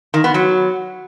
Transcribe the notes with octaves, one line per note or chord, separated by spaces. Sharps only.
D#3
B3
F#3